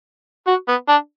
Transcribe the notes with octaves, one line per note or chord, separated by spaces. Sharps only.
F#4
B3
D4